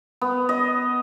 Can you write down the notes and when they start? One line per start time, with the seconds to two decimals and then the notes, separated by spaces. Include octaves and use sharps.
0.21 B3
0.49 D#5